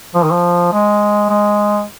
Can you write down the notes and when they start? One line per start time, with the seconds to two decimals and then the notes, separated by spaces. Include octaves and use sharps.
0.15 F3
0.23 D#3
0.31 F3
0.73 G#3
1.29 G#3